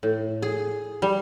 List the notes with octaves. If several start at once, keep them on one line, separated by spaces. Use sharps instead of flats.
A2
G#4
G3